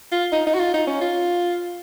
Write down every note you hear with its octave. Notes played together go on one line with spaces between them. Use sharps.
F4
D#4
D#4
F#4
F4
D#4
C#4
F4